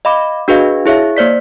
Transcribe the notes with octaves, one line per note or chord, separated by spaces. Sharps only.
D#5 F5 B5 D6
D4 F#4 G#4 B4 D#5 F5
E4 G#4 C#5 E5 F5
A#3 C5 D5 B6